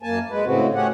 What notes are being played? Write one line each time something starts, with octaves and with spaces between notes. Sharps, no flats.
F#2 A#3 G#5 A5
G#3 B4
A2 C#3 G#3 C4 F#4
A3 C#4 G4 G#4 F#5